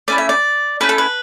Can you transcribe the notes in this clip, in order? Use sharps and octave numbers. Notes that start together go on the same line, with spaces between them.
A3 C#4 E4 D5
E5
D5
A3 C#4 E4 B4
A4
B4